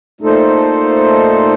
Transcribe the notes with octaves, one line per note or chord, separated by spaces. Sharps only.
A#2 A3 D#4 A4 C5